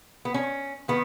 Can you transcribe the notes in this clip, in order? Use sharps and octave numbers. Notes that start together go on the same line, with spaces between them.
B3
C#4
D#3 B3